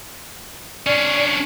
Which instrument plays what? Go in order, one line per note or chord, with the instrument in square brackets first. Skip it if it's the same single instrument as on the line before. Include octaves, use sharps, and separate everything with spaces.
[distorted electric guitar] C#4 D4 [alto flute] D5